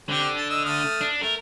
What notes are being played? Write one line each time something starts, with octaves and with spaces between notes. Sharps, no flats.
D3 C4 G4
A5
D#5 E6
A3 D#6 F6
D4
A3 A#4